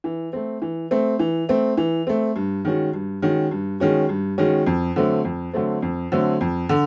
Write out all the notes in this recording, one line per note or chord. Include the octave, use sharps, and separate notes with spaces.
E3
A3 C4
E3
A3 C4
E3
A3 C4
E3
A3 C4
G2
D#3 G#3 C#4 F#4
G2
D#3 G#3 C#4 F#4
G2
D#3 G#3 C#4 F#4
G2
D#3 G#3 C#4 F#4
F2
D3 F#3 A3 C4
F2
D3 F#3 A3 C4
F2
D3 F#3 A3 C4
F2
D3